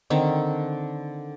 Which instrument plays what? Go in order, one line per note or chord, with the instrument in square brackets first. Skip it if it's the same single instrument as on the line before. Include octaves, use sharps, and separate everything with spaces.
[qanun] D3 D#3 C4